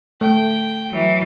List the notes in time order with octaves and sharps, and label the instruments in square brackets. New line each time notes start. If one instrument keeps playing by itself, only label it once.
[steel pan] A3 [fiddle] G5
[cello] E3 F#3